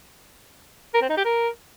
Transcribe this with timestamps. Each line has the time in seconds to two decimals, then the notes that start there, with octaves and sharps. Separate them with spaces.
0.94 A#4
1.02 C4
1.09 D#4
1.17 G4
1.25 A#4